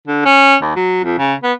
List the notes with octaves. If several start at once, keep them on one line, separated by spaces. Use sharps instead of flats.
D3
C#4
D#2
F#3
F2
C#3
B3